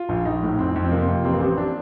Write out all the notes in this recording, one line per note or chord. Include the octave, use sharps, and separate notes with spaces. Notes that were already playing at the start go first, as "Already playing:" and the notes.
Already playing: F4
A#1
A#1 D#4
A2
F2 C4
F2
C4
C3 A#3
F2
A1 C4
A#3
A1 C4
D4